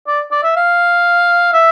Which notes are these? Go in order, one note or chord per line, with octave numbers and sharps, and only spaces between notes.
D5
D5
E5
F5
E5